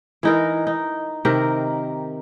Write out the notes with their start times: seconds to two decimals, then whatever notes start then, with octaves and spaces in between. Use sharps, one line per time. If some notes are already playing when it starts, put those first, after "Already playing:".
0.23 E3 D#4 A#4
0.67 D#4
1.25 C3 D#3 G4 A#4